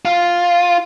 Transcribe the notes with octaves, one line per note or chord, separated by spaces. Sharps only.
F4